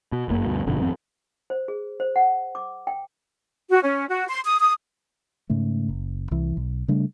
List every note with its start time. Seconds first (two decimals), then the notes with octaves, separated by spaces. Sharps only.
0.12 B2
0.28 G1 F#2 A#3
0.46 D2 G2 B2
0.66 G1 F2 B2 D3
0.81 G#1 F2 C4
1.50 C5
1.68 G#4
2.00 C5
2.16 F#5
2.55 D6
2.87 G5
3.70 F#4
3.83 C#4
4.08 F#4
4.29 C6
4.45 D#6
4.60 D#6
5.50 G#2 C#3 A3
5.89 F#1
6.31 C2 E3
6.57 B1
6.88 C#3 G3 A3 D4